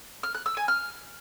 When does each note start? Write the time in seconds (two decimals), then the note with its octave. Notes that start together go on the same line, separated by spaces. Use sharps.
0.23 F6
0.35 F#6
0.46 E6
0.57 G#5
0.68 F6